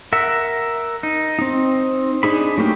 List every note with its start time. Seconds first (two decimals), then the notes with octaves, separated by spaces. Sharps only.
0.13 A#4 E5 F#5
1.03 D#4
1.39 C4 D#4
2.23 D4 D#4 G#4 B5
2.58 F#3 A3 A#3 G4